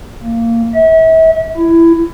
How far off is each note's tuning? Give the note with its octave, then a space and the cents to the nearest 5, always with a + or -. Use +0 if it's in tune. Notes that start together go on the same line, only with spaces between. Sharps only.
A#3 -15
E5 -35
E4 +15